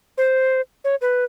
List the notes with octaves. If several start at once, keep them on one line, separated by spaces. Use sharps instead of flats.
C5
C#5
B4